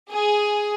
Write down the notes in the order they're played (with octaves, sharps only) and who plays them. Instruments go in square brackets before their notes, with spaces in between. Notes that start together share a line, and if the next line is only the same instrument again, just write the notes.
[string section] G#4